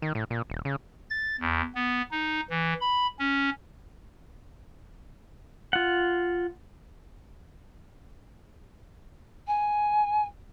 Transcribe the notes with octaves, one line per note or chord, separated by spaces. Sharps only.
D#3
A2
A#2
D#1
C#3
A6
E2
B3
D#4
E3
B5
C#4
F4 F#5
G#5